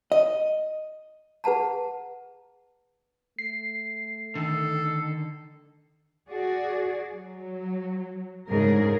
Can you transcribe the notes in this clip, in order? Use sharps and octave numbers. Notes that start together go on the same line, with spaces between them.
D#5
G#4 B4 F#5 A5 A#5
A3 C7
D3 D#3 A4
F#4 G#4 D5
F#3
D2 G#2 C#3 G#4 A#4